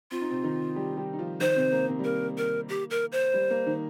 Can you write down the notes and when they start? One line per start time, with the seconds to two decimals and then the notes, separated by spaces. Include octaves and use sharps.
0.11 C4 F4
0.21 D#4
0.31 C3 C4
0.44 D#3 D#4
0.76 G3 G4
0.97 G3 G4
1.13 D#4
1.18 F3 F4
1.40 D#3 D#4 C5
1.56 C3 C4
1.72 A#3
1.88 C3 C4
1.99 G3
2.04 A#3 A#4
2.38 A#4
2.69 G4
2.90 A#4
3.12 C5
3.34 G3
3.50 A#3
3.66 D#3 D#4